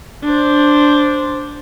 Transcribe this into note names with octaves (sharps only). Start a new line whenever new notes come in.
D4 C5